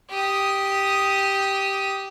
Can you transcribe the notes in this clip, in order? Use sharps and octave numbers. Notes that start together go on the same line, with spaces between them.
G4 D#6